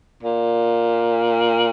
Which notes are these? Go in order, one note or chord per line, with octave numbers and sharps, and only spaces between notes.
A#2